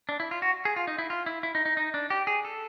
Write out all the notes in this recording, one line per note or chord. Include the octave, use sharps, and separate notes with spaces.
D4
E4
F4
F#4
G#4
F4
D#4
E4
F4
E4
E4
D#4
D#4
D#4
D4
G4
G#4
A4